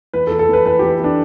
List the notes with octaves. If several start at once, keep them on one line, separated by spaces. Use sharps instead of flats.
E3 B4
A4
E3
A4
E3 B4
E3 B4
E3 G4
E3 D4